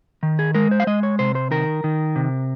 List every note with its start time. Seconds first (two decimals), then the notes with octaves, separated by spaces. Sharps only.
0.23 D#3
0.39 G#4
0.55 G#3 A#4
0.71 C5
0.80 F5
0.87 G#3 D#5
1.03 C#5
1.19 C3 C5
1.35 C5
1.51 D#3 A#4
1.84 D#3
2.16 C3